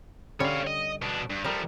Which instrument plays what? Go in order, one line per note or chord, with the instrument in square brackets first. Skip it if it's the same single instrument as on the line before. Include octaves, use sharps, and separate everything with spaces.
[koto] D3 G3 C#4 [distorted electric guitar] C#5 F5
[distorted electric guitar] D#5
B2 D4
G2
[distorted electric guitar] F3 A3 [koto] G3 A#4